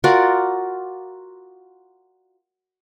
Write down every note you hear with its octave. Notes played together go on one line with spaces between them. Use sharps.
F4 F#4 A#4 D5